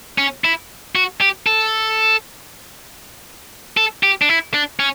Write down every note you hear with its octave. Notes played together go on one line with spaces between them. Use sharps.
C#4
E4
F#4
G4
A4
A4
G4
D4
E4
D4
C#4